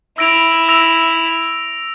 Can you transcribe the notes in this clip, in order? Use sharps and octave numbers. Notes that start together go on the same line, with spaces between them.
E4 E6 A#6 D7 F7
E6 A#6 D7 F7